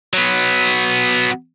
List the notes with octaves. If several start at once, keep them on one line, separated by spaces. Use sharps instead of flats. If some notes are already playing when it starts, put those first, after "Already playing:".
F#3 B3